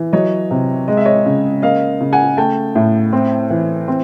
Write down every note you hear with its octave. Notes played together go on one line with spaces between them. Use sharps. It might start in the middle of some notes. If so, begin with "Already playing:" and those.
Already playing: E3
F#3 C#5 D#5
C3
G#3 D#5
E5
C#5 D#5
C#3
A#3 D#5 F5
C#3
F#5 G#5
A3 G5 A5
A2
C4
E3
C4